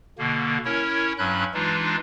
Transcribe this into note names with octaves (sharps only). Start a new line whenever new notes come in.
B2 D3 A#3
C#4 E4 A#4 C#5
G2 F#3 C#4 B5 F#6
E3 G#3 D4 D#4 F4